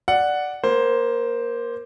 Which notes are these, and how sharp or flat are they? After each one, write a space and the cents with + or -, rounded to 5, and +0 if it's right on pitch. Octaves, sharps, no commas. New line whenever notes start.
D5 +0 F#5 +0
A#3 +15 C5 +0